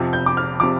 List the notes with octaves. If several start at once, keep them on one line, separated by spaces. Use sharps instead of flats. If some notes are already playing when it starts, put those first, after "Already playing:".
Already playing: F2 C3 F3
G6
D6
F6
C3 F3 D6